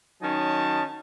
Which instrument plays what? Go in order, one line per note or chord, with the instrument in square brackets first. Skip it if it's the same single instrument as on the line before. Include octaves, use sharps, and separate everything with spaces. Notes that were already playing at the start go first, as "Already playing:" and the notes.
[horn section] D#3 F#3 C#4 D#4 D#5 A5